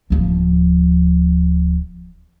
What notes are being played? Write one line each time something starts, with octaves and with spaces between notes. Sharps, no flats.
D1 F3